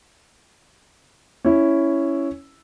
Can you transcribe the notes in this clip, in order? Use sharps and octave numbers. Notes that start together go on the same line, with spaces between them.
C#4 E4